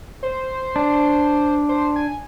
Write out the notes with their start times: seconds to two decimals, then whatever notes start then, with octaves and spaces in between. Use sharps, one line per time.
0.23 C5
0.76 D4
1.69 C5
1.96 G#5